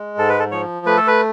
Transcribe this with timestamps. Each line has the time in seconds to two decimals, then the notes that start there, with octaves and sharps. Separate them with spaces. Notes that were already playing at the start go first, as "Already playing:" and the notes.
Already playing: G#3
0.18 G#2 A4
0.29 B4
0.39 A4
0.51 F3 C#5
0.86 A3 B4
0.97 A4
1.07 B4